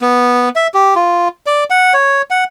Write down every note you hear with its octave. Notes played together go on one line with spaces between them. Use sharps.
B3
E5
G4
F4
D5
F#5
C#5
F#5